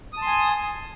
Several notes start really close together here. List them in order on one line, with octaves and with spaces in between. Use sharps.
D#6 A5 C6 G#5